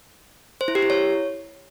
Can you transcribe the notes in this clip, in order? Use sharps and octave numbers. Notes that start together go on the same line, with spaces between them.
C5
E4
G4
E4
C#5